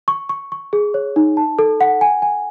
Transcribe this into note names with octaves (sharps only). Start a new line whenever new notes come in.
C#6
C#6
C#6
G#4
C#5
D#4
A5
A4
F#5
G#5
G#5